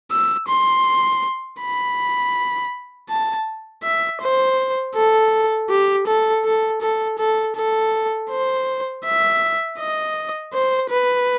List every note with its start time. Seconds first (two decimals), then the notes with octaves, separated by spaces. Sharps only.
0.11 E6
0.48 C6
1.61 B5
3.09 A5
3.84 E5
4.21 C5
4.95 A4
5.70 G4
6.07 A4
6.45 A4
6.82 A4
7.19 A4
7.56 A4
8.30 C5
9.04 E5
9.79 D#5
10.53 C5
10.90 B4